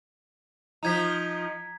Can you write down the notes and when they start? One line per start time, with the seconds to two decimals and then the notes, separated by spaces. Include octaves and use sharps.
0.83 F3 D#4 A#5 G#6 B6